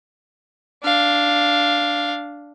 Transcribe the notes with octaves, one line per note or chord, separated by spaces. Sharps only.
D4 F5